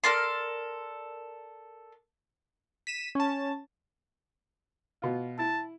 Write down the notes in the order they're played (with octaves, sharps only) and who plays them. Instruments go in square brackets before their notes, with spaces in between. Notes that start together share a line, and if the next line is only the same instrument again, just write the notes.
[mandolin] A4 A#4 D5 C6
[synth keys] B6 D#7 E7
C#4 A5
[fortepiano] B2 F4
[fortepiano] E4 [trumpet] A5